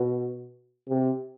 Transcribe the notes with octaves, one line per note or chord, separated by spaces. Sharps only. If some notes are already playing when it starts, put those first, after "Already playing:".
Already playing: B2
C3